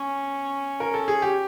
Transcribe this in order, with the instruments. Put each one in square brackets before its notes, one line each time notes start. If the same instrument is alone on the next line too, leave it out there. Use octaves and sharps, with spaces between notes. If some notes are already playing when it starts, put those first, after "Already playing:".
Already playing: [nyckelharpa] C#4
[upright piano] A#4
A4
G#4
G4